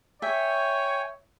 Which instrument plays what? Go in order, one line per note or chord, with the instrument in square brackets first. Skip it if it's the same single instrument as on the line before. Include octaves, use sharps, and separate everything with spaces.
[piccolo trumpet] C#5 [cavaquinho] E5 [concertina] G5 G#5